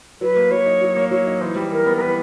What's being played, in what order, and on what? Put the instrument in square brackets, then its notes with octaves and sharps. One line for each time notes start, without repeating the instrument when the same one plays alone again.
[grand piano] F#3 [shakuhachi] B4
[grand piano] A#3
[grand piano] F#3 [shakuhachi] C#5
[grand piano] D#4
F#3
A#3
[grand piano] F#3 [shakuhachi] C#5
[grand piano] D#4
[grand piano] E3 [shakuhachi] C5
[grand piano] G3
[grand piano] E3 [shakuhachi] A#4
[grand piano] B3
[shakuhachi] A#4
[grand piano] E3 [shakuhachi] B4